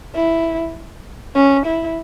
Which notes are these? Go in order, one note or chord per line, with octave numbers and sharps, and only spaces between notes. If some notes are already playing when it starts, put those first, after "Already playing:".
E4
C#4
E4